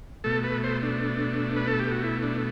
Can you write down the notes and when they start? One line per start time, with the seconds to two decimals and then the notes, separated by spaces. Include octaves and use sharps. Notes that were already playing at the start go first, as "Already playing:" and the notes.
0.24 B2 A3 A4
0.44 B4
0.64 C5
0.83 D4
1.56 B4
1.68 A4
1.80 G4
1.91 F#4
2.03 E4
2.23 D4